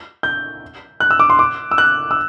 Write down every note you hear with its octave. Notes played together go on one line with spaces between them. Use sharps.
G6
F#6
E6
D6
C6
D6
E6
F#6
E6